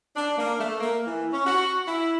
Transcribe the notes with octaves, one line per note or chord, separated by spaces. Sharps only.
D4
A#3
A3
A#3
E3
C#4
F#4
E4